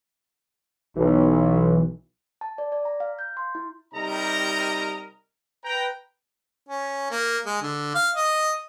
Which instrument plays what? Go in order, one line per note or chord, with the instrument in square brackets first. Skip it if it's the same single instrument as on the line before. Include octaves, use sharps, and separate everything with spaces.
[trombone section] B1 [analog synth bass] E3
[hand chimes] A5
D5
D5
A#5
F5
G6
C6
E4
[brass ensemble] C3 G3 D#4 A#4 D#5 A#5
B4 G5 A#5
[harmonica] C#4
A#3
G#3
D3
F5
D#5